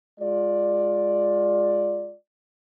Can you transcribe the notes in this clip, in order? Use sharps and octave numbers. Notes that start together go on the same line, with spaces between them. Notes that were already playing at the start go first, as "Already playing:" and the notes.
G#3 F4 D5